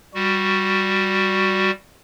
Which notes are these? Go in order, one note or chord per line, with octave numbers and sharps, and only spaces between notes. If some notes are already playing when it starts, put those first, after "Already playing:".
G3 F#4